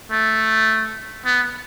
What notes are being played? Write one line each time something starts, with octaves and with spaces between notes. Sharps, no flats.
A3
B3